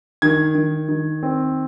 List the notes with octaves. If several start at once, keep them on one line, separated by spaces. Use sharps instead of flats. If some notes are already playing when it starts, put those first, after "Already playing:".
D#3 G#6
D#3
D#3
C4